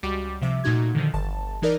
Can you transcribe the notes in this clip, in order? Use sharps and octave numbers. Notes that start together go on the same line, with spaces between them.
C#2 G3 F#4 D6
C3 F3 E5 D6
A#2 A3 D#4 F#4 G#6
D3 D#3 F3
G1 A5
E3 D#4 A#4 D5